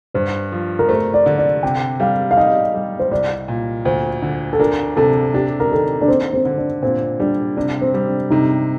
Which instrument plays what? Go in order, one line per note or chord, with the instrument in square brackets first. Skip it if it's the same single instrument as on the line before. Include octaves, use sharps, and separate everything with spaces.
[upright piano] G2 [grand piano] C5
[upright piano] F3
[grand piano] A#4
[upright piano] A3 [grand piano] C5
[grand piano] D5
[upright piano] D3
[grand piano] D5
[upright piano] C3 [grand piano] G5
[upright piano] G3 [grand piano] F5
[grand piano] F5
[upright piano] D#4 [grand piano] D#5
[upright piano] G3
[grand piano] C5
[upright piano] C2 [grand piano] D5
[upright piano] A#2
[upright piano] D2 [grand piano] C5
[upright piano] D3
[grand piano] A4
[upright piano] D4 [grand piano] A#4
[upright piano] C3 [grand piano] A4
[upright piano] D4 [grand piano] G4
[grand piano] A#4
[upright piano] D#3 [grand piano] A4
[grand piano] D4
[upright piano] A#3 [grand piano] C4
[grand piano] C4
[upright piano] D3
[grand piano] D4
[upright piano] A#2 [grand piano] C4
[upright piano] G3 [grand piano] D4
[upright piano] C3 [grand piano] D4
[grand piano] C4
[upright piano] G3
[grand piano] D4
[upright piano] C3 [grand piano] D#4